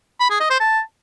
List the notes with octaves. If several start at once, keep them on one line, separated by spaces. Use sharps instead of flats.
B5
G#4
D#5
C5
A5